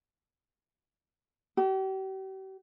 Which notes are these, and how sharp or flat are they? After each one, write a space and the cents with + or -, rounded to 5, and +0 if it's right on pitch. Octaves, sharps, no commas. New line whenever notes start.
G4 -40